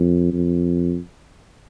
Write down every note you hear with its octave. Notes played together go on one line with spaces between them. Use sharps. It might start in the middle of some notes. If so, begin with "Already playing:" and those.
Already playing: F2
F2